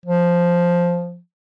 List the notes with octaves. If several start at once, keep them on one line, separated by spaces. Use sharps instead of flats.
F3